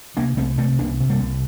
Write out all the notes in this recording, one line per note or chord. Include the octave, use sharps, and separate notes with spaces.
C3 A#3 D4
C2 A3 C4
C3 A3 C4
C2 A#3 D4
C3
G3 A#3
C2